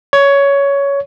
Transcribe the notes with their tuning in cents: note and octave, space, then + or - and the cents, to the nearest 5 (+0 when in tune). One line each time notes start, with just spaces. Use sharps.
C#5 +15